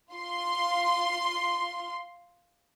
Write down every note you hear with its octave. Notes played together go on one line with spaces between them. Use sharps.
F4 C6